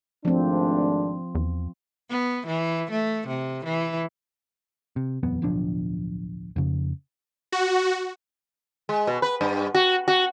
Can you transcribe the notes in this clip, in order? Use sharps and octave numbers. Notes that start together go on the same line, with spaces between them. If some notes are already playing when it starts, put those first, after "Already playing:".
G#1 F3 A3 C4 D4
E2
B3
E3
A3
C3
E3
C3
D#1 F2 B3
D1 B1 F3 D4
F2 C#3
F#4
G#3
B2
B4
G2
F#4
F#4